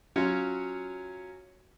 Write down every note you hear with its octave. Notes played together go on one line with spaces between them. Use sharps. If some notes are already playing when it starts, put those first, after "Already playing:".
F#3 C#4 F4 C#5